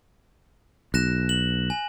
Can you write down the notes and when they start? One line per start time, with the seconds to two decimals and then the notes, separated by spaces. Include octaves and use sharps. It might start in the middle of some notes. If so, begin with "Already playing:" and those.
0.94 B1 F#6 A#6 E7
1.29 F#7
1.70 G#5